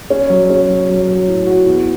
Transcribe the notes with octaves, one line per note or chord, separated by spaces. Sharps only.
C#4
F#3
C#4
F#3
F#3
F#3
A2
F#4
E2